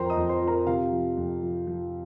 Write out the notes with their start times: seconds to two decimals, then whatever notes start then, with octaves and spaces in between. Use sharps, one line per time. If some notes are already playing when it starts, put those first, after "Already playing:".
Already playing: F2 F3 A#4 C5 G5 A#5 C6
0.10 D#5 D#6
0.17 F2
0.29 C5 C6
0.41 F3
0.47 A#4 A#5
0.67 C3 F4 F5
0.92 F3
1.17 F2
1.42 F3
1.67 F3